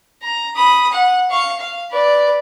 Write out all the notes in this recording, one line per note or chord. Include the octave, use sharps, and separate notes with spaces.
A#5
B5 D#6
F#5
F5 C#6
F5
B4 D5